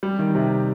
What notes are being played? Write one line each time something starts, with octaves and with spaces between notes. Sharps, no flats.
G3
D#3
C3